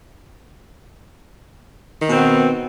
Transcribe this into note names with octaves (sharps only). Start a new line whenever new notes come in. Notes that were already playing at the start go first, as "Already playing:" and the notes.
B2 D#3 B3 C4